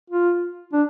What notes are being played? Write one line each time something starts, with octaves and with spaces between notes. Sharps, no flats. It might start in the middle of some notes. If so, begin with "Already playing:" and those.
F4
D4